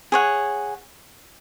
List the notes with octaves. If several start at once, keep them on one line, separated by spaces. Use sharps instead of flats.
G#4 C#5 F#5